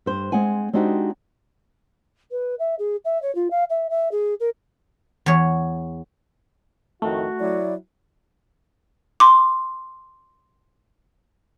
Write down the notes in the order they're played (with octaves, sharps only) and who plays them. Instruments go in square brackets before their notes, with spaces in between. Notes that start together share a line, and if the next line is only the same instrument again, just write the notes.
[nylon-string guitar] G2 C5
G#3 C4 F#5 G#5
G#3 C4 D4 D#4 F#4 G4
[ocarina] B4
E5
G#4
E5
C#5
F4
F5
E5
E5
G#4
A#4
[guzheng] E2 C#5
[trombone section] F2 A2 D#3 [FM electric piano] A3 [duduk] F#4
[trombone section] F#3 E4 [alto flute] D5
[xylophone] C6 D6